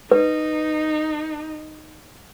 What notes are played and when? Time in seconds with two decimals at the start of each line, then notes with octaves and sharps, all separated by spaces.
0.11 D#4 B4